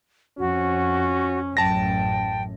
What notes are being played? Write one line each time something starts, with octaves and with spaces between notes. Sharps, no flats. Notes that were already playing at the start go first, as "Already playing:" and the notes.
F2 C#4 F#4
A1 F#2 G5 A5 A#6